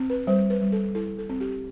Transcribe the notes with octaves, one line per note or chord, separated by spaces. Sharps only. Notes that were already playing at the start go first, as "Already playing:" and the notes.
Already playing: C4
B4
G3 C5
B4
G3
A4
E4 A4
A4
C4
G4